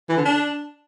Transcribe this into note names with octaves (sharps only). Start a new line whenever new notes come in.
E3
D3
D4